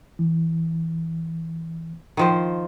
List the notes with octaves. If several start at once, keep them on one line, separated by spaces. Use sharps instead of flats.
E3
D#3 F3 C5